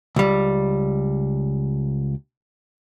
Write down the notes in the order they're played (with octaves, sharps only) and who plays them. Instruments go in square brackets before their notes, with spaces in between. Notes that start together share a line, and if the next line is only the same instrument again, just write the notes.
[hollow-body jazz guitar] C#2 G3